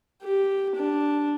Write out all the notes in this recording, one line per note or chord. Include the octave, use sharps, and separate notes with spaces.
G4
D4